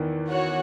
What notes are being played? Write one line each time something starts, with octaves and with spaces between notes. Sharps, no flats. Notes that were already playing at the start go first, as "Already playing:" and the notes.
Already playing: E2 D#3 E3
F#4 C#5 F#5